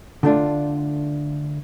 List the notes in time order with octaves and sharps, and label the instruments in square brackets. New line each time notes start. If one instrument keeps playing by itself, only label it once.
[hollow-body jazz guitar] D3 A3 D4 F4